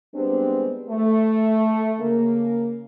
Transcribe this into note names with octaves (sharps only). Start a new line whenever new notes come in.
G3 G#3 B3 C4 D4
A3
C#3 A#3